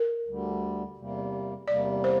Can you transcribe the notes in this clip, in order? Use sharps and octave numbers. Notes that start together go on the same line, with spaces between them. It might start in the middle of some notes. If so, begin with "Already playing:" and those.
Already playing: A#4
D2 D3 G3
E2 C3 G3 A#3
E2 C3 G3 A#3 D5
C5